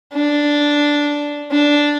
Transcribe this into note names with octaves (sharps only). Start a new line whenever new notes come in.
D4
D4